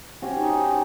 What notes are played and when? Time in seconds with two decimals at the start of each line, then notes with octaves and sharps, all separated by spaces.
0.22 C#4 F#4 G4
0.35 D#4